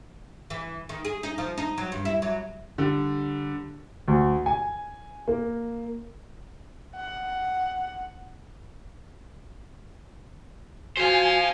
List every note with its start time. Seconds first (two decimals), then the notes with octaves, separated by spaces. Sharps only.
0.50 E3
0.89 D#3
1.05 G#4
1.23 D#4
1.38 F3
1.58 D#4
1.78 F#3
1.92 G2
2.05 E4
2.22 F#3
2.78 D3 G3
4.08 D2
4.46 G#5
5.28 A#3
6.95 F#5
10.97 F#4 C5 F5 G#5